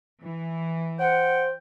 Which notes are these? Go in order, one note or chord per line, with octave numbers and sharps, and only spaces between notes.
E3
C5 F#5 G5